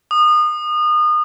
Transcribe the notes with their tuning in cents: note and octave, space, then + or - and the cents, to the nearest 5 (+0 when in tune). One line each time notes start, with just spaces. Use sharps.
D#6 -30